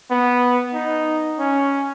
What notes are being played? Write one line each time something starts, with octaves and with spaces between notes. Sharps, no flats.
B3
D#4
C#4